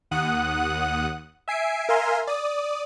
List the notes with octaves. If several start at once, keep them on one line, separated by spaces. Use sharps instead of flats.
D#2 F#5 D#6 F#6
E5 G#5 C7 D7
A#4 E5 F5 G#5 C6
D5 D#6